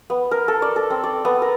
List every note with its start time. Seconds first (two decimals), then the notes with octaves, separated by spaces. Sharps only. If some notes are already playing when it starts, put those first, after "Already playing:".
0.10 B3
0.31 A#4
0.48 A4
0.62 D5
0.76 A4
0.90 C4
1.04 D5
1.25 B3
1.42 A#4